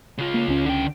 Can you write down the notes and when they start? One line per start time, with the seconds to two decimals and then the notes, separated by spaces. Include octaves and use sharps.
0.18 C#3 F4
0.34 A#3
0.48 C#2 C#4
0.66 D3 G5